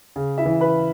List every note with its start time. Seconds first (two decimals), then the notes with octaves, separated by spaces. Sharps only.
0.16 C#3
0.38 E4 E5
0.46 E3
0.61 B4 B5